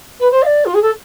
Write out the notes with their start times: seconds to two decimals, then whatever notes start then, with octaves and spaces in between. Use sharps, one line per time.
0.19 B4
0.30 C5
0.42 F5
0.45 D5
0.65 F4
0.74 G#4
0.82 A4